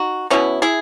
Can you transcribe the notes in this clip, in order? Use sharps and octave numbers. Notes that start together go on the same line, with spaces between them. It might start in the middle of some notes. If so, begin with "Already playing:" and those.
Already playing: D#4 F#4
B2 G#3 B3 C#4 E4
E4 G#4